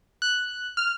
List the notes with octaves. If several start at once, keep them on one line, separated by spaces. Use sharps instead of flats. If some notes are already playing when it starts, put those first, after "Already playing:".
F#6
F6